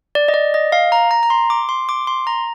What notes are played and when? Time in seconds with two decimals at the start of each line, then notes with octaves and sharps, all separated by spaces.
0.15 D5
0.28 D#5
0.34 D5
0.54 D#5
0.72 F5
0.92 A#5
1.11 A#5
1.23 A#5
1.30 C6
1.50 D6
1.69 C6
1.89 D6
2.07 C6
2.27 A#5